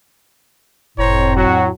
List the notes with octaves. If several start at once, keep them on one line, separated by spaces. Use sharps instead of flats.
F#1 F2 A2 C5 C#5 A#5
F#3 F#4